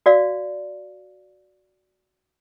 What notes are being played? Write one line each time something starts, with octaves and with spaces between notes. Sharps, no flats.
F#4 D5 F5